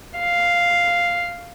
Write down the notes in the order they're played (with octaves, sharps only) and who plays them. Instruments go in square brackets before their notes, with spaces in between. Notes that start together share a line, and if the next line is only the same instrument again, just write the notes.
[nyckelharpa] F5